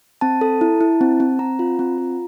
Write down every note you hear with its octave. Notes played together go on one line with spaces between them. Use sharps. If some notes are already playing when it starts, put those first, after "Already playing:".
C4 A5
A4
E4
E4
C4
C4
C4 A#5
F4
C4
F4